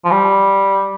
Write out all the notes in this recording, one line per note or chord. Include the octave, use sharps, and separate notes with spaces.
F3
G3